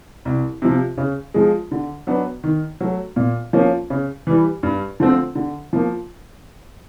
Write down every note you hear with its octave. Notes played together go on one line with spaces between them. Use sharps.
C2
C3 F3
C#3
F3 G#3
D3
F#3 B3 D4
D#3
F#3 A3
A#2
F3 A#3 C#4
C#3
E3 G3
G2
D3 F3 A3 C4
D3
F3 A#3